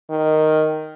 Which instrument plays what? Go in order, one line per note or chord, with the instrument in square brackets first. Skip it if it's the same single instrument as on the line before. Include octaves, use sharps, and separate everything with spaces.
[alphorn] D#3